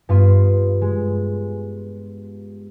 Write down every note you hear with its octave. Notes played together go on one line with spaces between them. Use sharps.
G2 B3 F4 C6 C7
G#3